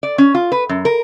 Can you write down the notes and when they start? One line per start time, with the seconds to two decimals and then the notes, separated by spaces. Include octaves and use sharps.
0.03 D5
0.18 C#4
0.35 F4
0.52 B4
0.69 F#2
0.85 A#4